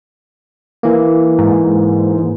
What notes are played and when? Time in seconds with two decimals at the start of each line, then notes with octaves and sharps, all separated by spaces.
0.83 E3 A#3
1.39 G#2